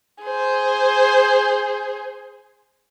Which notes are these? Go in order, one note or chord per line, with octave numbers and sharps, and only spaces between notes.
G#4 C5